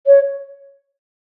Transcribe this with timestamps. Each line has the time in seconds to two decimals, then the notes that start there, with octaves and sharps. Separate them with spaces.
0.06 C#5